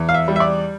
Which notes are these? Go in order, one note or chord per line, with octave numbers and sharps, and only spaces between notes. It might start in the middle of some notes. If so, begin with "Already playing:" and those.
Already playing: E2
F5
E5
G3
E5
D5